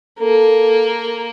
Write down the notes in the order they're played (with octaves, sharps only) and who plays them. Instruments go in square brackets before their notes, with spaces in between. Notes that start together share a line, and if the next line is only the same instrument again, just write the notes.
[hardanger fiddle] A#3 [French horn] A4